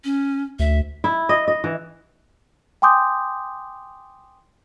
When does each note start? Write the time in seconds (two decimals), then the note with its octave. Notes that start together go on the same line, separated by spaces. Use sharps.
0.04 C#4
0.59 D2 E5
1.04 E4
1.29 D#5
1.48 D#5
1.64 E3
2.82 G5 G#5 C6 D6 D#6 G6